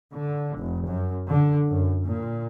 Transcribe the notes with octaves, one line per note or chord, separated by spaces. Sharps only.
D3
F1
F#2
D3
F#2
A#2